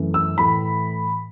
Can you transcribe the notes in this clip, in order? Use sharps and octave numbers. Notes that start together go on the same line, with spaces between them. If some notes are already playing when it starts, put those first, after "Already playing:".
Already playing: F#2 E3 A3
E6
A2 E3 A3 B5